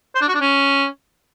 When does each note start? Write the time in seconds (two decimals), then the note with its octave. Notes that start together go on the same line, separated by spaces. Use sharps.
0.15 C5
0.21 D4
0.28 F#4
0.34 D4
0.41 C#4